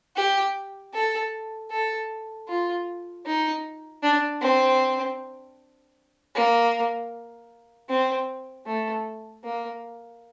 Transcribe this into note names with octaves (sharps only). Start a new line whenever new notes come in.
G4
A4
A4
F4
D#4
D4
C4
A#3
C4
A3
A#3